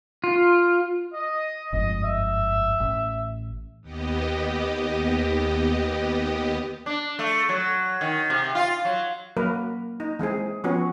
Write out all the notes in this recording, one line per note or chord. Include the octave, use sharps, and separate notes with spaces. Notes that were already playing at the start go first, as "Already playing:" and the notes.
F4
D#5
G1 F2 G#2 D#5
E5
A1
D#2 B3 G4 D#5
D4
A3
F#3
D#3
C3
F4
F#3
F#3 A#3 A#4 B4
D#4
E3 G#3 C4 G#4
F3 B3 C#4 F#4